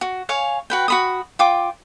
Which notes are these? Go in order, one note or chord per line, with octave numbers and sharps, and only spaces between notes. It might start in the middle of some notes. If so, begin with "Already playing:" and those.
F#4
C#5 F5 G#5
F#4 B4 G5
F#4 B5 D#6
F4 G5 D6